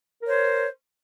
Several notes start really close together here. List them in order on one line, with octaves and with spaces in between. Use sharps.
A#4 C#5 C5